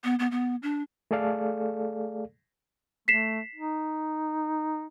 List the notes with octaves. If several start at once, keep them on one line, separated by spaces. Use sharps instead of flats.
B3
B3
B3
D4
A3 G#4 A4 D5 F5
A3 B6 C7 E7
D#4